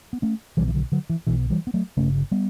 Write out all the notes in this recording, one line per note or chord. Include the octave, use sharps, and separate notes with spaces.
B3
A3 C#4
B1 B2 E3 G3
E3
D3 F#3
D3 F#3
E3
B1 B2 E3
E3 G3
B3
F#3 A3
G1 F#2 C#3 A3 C#4
G3 B3